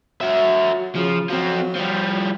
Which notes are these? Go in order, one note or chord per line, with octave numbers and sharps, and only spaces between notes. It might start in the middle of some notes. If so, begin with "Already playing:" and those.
F#3 F#4 E5
C#3 F3
F3 F#3 C4
F3 G3